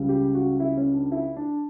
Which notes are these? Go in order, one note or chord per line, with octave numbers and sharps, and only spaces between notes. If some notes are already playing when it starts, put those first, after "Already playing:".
Already playing: C#2 C#3 G3
G4
F#4
E4
C#4
D4
E4
D4